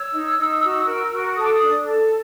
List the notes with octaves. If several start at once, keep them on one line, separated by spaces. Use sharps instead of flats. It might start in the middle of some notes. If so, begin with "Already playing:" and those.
Already playing: C#5 E6
D#4
D#4
F#4
A#4
F#4
A4 D#6
D6
D#6
D4
A4